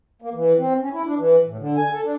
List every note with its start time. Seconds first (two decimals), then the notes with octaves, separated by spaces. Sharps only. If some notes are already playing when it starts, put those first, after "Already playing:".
0.22 A#3
0.34 E3
0.59 C4
0.81 C#4
0.93 E4
1.06 D4
1.18 E3
1.47 A2
1.59 D3
1.77 G#5
1.92 A4
2.05 D4